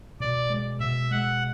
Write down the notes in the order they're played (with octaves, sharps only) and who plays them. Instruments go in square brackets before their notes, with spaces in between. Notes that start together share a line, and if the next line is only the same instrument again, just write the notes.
[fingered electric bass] B2 [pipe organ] D5
[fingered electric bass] G#3
[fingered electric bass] B2 [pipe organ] E5
[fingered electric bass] G#3 [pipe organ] F#5